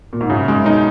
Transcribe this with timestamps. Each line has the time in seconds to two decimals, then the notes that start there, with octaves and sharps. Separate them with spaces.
0.13 A#2
0.21 G#2
0.30 F#2 C#3
0.48 F#2 G#3
0.66 B2 D#4